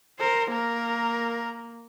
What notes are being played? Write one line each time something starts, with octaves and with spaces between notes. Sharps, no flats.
A#4 C5
A#3 A#4